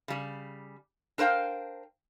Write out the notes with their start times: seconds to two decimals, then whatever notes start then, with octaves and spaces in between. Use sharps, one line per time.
0.08 C#3 G3
1.18 D4 A#4 C5 F5 G5